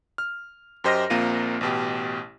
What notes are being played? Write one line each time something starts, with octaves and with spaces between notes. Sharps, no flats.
F6
F#2 G4 C5 D#5 F6 A#6
A#1 A#3 C4 F4 D#7
A1 B2 G4